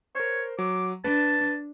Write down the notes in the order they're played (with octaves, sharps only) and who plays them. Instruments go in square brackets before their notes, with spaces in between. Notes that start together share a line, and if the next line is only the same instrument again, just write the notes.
[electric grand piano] A#4 C5 [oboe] C#5
[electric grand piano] F#3 [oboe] D6
[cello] D4 [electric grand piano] B4 [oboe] A5